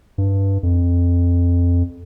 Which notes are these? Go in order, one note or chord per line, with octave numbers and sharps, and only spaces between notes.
G2
F2